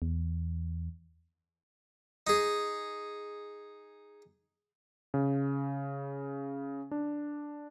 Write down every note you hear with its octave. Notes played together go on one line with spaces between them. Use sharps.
E2
D#4 G#4
C#3
D4